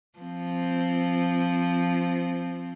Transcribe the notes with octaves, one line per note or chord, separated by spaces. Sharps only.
F3 C4